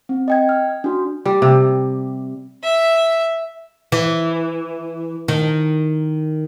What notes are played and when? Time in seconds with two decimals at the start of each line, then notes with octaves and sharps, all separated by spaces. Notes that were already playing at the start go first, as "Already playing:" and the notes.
0.09 C4
0.28 D#5 G5 G#6
0.49 F6
0.84 D4 F#4
1.25 G3
1.42 C3
2.64 E5
3.92 E3
5.28 D#3